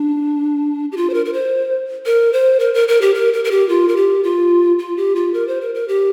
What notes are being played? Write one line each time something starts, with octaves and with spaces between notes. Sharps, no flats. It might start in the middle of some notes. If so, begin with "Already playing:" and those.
Already playing: D4
G4
F4
C5
A#4
A#4
C5
A#4
C5
A#4
A#4
A#4
G4
A#4
A#4
A#4
G4
F4
A#4
G4
F4
F4
G4
F4
A#4
C5
A#4
A#4
G4